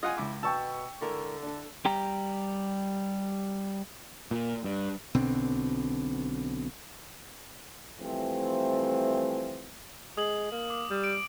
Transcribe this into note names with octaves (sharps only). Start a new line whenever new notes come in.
F4 D#5 F#5 G#5
C#2 E4 D6
B2 G5 A5 C#6 E6
D3 G#3 E4 A#4
D4 A4
G3 G4 G5 A#5
A#2
G2
B1 B2 D3 C4
E3 F3 G3 A3 C4
G#3 D#6 F#7
A#3
D6
G3
D7